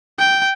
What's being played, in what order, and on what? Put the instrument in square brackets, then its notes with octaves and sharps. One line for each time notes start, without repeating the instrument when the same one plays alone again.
[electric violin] G5